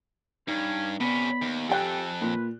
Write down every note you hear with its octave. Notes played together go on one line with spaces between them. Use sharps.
G2 C#4 D#4
C3 B3 C#4 D5 B5
D#2
F2 G4 A4 G5 G#5 F#6
A#2 B4